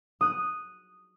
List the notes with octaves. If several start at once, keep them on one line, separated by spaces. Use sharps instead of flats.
D#6 F#6